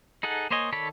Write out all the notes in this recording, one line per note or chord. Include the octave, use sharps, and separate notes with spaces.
D#4 G#4 A4 F#5
A#3 C5 C#5 D#5 G#5
D#3 A4 C#5 D5 B5